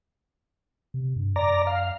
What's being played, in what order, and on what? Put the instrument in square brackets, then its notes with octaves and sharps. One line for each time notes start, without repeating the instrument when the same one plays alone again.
[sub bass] C3
G2
[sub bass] F#2 [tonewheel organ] D5 A#5
[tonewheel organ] F5